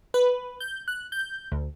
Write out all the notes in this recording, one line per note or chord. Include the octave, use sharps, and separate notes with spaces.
B4
G6
F#6
G6
D2